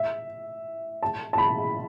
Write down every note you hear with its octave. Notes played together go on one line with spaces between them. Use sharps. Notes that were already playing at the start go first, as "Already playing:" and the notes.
Already playing: E5
A5
A5
B5